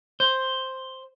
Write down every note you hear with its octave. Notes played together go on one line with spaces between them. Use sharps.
C5